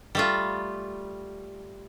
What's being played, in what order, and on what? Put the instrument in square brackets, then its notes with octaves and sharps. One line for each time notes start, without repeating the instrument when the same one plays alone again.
[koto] G3 A3 F4